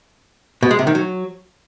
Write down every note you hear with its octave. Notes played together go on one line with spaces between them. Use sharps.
B2
G#3
C3
D#3
F#3